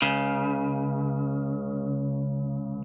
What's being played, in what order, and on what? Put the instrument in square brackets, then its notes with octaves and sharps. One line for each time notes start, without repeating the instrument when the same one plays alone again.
[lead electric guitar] C#2 C#3